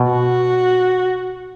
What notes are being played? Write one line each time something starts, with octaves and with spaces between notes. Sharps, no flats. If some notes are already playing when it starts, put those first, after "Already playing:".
Already playing: B2
F#4